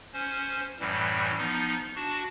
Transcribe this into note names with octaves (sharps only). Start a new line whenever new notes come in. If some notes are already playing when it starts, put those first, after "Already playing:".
C#4 C5
F#2 A2 E3 G3
F3 B3 D#4
D4 F#4 A5